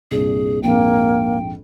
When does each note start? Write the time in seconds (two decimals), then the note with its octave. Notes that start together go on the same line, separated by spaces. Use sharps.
0.11 C2 G2 A#2 G#4
0.63 A#1 F2 G#2 A#3 G5